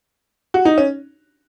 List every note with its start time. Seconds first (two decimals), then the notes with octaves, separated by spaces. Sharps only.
0.54 F#4
0.65 D#4
0.78 C#4